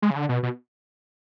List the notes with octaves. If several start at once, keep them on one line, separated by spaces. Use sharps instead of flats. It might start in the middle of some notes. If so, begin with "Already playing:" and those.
G#3
C#3
D3
B2
B2